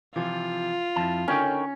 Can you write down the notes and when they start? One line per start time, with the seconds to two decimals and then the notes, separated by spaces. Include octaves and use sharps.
0.16 C3 E3 F3 F4
0.96 F2 F3 E4 A5
1.28 D3 C#4 D#4 A#4 C#5 G5